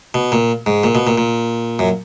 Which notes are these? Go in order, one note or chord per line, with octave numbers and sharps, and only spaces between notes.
B2
A#2
G#2
A#2
B2
A#2
A#2
F#2